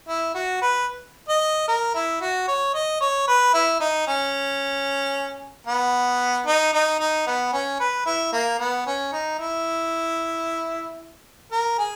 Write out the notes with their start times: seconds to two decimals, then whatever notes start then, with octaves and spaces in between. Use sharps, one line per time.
0.08 E4
0.34 F#4
0.62 B4
1.28 D#5
1.68 A#4
1.94 E4
2.21 F#4
2.48 C#5
2.74 D#5
3.01 C#5
3.28 B4
3.54 E4
3.80 D#4
4.07 C#4
5.67 B3
6.46 D#4
6.73 D#4
6.99 D#4
7.27 B3
7.53 C#4
7.79 B4
8.06 E4
8.32 A#3
8.59 B3
8.86 C#4
9.12 D#4
9.39 E4
11.51 A#4
11.78 G#4